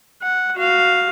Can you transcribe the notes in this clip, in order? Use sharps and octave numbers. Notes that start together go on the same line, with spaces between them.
F#5
F#4 F5